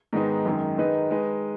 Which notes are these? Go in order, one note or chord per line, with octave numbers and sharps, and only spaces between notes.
G#2 D#3 G#3 B3 D#4
F#2 D#3 G#3
D#3 G#3 D#4 B4
G#3 D#4 B4